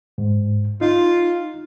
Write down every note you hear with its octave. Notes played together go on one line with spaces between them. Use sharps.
G#2
D#4 F4